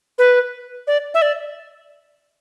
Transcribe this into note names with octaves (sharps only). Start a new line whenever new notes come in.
B4
D5
E5
D5